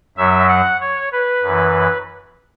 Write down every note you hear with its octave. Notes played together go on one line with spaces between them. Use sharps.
F#2 F#3 E5
F#5
C#5
B4
F#2 E3